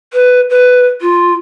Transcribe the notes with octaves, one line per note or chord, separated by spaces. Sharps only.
B4
B4
F4